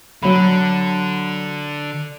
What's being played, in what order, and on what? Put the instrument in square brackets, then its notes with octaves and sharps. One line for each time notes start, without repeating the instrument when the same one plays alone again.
[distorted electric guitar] D3 [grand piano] F#3 B5